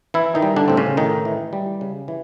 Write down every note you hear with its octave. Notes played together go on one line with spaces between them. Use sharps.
E3 E4
D#3 D#4
G3
D3 D4
A2 C4
C#3 C#4
A2 D#3 D#4
E3
G3
C#3
E3